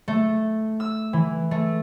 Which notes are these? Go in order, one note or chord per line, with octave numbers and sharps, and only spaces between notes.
A3
E6
E3
A3